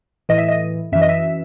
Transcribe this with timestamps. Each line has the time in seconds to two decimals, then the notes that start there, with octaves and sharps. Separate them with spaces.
0.29 A2 E3 D#5
0.38 E5
0.48 D#5
0.92 F#2 E3 E5
1.01 D#5
1.09 E5